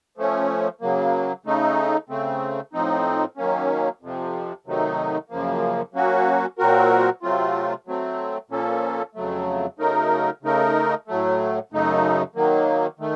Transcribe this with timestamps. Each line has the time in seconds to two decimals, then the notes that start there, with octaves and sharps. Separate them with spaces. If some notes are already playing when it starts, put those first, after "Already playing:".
0.18 F3 A3 C#4
0.81 C#3 F#3 A#3
1.46 C#3 A3 D#4
2.09 C#3 A3 C4
2.73 A2 F3 C4 D#4
3.37 D#3 F#3 A#3 C#4
4.01 F2 C3 F3
4.66 C3 D#3 F#3 A3 D#4
5.30 F#2 C#3 F3 A#3
5.94 F#3 A#3 C#4 F#4
6.58 A#2 F#3 C4 F#4 A#4
7.22 C3 F#3 A3 C4 F4
7.87 F#3 A3 C4
8.50 A#2 F3 A#3 C#4 A4
9.15 F2 C#3 F#3 A3
9.78 C#3 F#3 A3 D#4 A#4
10.43 C#3 A3 D#4 A#4
11.08 A2 F#3 A3
11.72 F#2 C#3 A3 D#4
12.35 D#3 F#3 A#3
12.99 D#3 A3